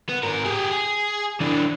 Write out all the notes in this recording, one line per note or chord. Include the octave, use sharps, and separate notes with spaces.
B3
G#2 A#4
G4 G#4
G#4
E3 D4